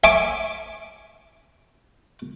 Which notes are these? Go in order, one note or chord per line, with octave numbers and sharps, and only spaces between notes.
E5 G#5 C#6 D6